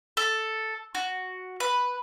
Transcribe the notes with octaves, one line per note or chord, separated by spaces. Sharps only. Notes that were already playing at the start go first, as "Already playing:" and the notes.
A4
F#4
B4